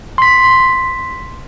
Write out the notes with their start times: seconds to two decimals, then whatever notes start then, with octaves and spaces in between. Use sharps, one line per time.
0.18 C6 B6